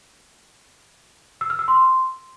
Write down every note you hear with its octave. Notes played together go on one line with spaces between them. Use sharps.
E6
F6
E6
C6